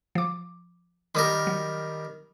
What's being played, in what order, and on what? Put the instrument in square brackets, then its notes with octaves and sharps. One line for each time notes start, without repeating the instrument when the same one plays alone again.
[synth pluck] F3 D6
[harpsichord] D#3 G3 A#4 [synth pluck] B5 D6 D#6
[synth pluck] F#3